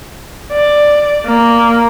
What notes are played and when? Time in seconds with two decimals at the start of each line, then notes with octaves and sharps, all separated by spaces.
0.52 D5
1.26 A#3